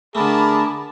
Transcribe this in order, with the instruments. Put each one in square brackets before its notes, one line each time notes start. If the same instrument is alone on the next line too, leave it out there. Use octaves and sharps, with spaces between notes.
[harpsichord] D3 A3 [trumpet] G#4 [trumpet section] A#4 A5 [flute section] B5 D6